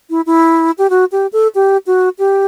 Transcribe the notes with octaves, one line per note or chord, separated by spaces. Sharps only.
E4
E4
G4
F#4
G4
A4
G4
F#4
G4